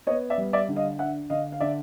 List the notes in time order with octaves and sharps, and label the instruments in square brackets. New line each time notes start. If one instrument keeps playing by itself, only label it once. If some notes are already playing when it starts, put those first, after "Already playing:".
[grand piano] B3 C#5 D#5
D5 E5
G3
D5 E5
D3
D#5 F5
D4 E5 F#5
D3 D#5 F5
F5
D3 D5 E5